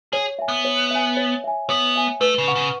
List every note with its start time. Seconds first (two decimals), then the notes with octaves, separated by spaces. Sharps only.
0.13 G#4 C#5
0.39 E5 G#5
0.48 B3
0.65 C#5
0.91 E5 G#5
1.17 C#5
1.44 E5 G#5
1.69 B3 C#5
1.95 E5 G#5
2.21 A3 B4
2.38 C#3
2.48 F#5 C#6
2.55 C#3